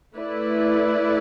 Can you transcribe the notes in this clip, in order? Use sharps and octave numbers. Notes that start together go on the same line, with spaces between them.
A3 E4 B4 D5